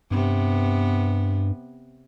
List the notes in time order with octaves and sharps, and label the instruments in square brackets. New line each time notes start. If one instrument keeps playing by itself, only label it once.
[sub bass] G2 [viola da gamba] C3 B3